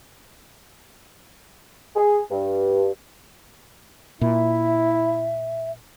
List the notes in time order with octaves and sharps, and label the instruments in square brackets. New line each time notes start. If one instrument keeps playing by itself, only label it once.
[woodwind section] G#4
G2
[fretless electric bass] A#2 [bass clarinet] E4 [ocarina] E5